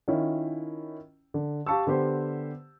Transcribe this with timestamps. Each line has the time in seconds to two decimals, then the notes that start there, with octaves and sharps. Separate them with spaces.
0.08 D#3 C#4 E4 F4
1.34 D3
1.66 G4 F5 A5 C#6 E6
1.87 D3 B3 G4 C5